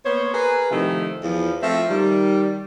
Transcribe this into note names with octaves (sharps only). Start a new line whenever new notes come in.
A#3 B3 C5 C#5
G#4 A#4 B4
A2 C3 D#3 F3 A3
E2 F3
F3 A3 C4 E5
D#3 G3